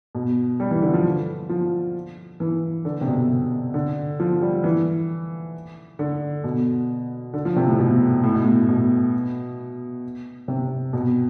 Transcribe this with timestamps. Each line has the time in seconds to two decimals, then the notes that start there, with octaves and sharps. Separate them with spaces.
0.15 B2
0.60 G3
0.71 E3
0.82 D3
0.94 F3
1.49 F3
2.40 E3
2.85 D3
3.01 C3
3.07 B2
3.30 C3
3.74 D3
4.20 F3
4.42 G3
4.64 E3
5.99 D3
6.44 B2
7.33 D3
7.45 F3
7.56 C3
7.68 A2
7.79 B2
8.23 A2
8.34 B2
8.44 A2
8.68 B2
10.48 C3
10.93 B2